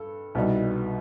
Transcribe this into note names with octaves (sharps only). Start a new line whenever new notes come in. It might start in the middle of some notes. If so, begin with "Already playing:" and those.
Already playing: G2 A4
C2 B2 G3 D#4